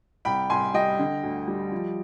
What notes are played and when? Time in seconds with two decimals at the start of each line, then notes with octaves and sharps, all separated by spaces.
0.25 C2 G5 B5
0.50 C2 G#5 C6
0.74 G3 D#5 G5
0.98 D3
1.23 D2
1.48 G3
1.72 F3